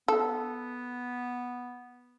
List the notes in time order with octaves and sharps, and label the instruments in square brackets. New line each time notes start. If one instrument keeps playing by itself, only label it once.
[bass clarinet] B3 [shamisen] A4